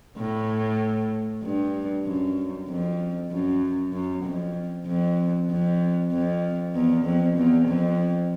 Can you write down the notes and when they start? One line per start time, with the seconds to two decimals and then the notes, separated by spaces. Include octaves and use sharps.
0.18 A2
1.43 G2
2.06 F#2
2.69 F2
3.31 F#2
3.93 F#2
4.24 F2
4.87 F2
5.50 F2
6.12 F2
6.75 E2
7.05 F2
7.37 E2
7.68 F2